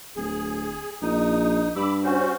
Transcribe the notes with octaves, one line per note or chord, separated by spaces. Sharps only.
D1 G#4
A#1 D#4 D#6
G2 B5 D6 E6
C#4 F#4 C5